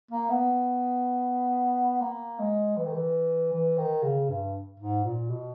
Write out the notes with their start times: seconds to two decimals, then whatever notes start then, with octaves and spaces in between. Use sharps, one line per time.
0.11 A#3
0.30 B3
2.01 A#3
2.39 G#3
2.77 E3
2.85 D#3
2.93 E3
3.53 E3
3.78 D#3
4.03 C#3
4.29 G2
4.80 G#2
5.04 A#2
5.30 B2